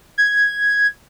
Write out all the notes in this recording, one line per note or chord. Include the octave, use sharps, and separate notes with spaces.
G#6